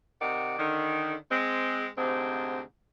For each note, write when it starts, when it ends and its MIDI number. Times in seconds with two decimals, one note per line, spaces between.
0.20 0.56 48
0.20 0.56 51
0.20 0.56 74
0.20 0.56 78
0.58 1.14 50
0.58 1.14 51
1.30 1.87 56
1.30 1.87 60
1.97 2.60 38
1.97 2.60 44
1.97 2.60 48
1.97 2.60 60